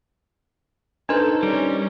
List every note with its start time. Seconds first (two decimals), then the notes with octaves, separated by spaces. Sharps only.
1.09 D4 D#4 A4 B4 C5
1.43 G3 C#4 A#4